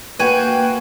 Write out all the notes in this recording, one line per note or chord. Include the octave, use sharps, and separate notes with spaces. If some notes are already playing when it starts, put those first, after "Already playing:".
A#3 F#4 B4 G5 G#5